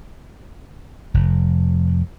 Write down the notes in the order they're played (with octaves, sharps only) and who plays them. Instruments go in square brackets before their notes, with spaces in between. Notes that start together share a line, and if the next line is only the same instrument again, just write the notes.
[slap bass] F1